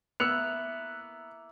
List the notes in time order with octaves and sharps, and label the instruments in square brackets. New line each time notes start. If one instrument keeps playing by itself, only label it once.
[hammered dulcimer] A#3 E4 [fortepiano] B3 [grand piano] E6 C#7 F7 [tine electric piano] F#6